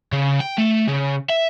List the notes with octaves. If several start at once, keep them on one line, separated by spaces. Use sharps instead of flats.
C#3
G5
A3
C#3
E5